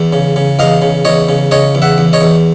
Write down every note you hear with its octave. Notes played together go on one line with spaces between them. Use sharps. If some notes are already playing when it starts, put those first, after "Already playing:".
Already playing: E2
C#3
C#3
E2 D#5 F5
C#3
E2 C#5 D#5
C#3
C#3 C#5 D#5
E2
E5 F#5
E2
C#5 D#5
E2